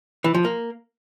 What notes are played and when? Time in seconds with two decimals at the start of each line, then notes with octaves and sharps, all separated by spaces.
0.24 E3
0.34 F3
0.45 A#3